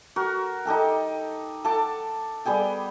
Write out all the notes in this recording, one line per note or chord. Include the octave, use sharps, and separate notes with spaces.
F#4 A#4
D#4 G4 A4 G5
A4 F#5 A5 D6
G3 B3 G#4 G5